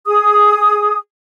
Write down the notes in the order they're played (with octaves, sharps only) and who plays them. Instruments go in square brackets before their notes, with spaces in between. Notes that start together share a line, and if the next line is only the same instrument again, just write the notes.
[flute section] G#4 D#6